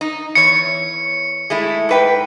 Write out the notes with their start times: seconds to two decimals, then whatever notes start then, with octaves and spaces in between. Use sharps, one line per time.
0.01 D#4
0.35 E2 C#5 C#7
1.50 G#3 A3 E4
1.89 G#2 B4 G5